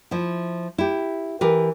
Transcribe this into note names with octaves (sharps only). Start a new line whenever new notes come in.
F3 E4
E4 G4
E3 G4 A#4 B4